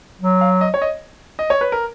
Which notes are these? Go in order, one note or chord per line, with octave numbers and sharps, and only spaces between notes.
F#3
F5
D#5
C#5
D#5
D#5
C#5
B4
A#4